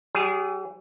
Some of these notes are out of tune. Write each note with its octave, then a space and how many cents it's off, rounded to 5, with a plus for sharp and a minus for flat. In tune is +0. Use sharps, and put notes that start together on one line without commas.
G3 -45 G#4 -15